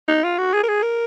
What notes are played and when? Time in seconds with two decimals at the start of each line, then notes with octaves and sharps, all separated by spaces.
0.08 D#4
0.23 F4
0.38 F#4
0.54 G#4
0.63 A#4
0.68 G#4
0.83 A#4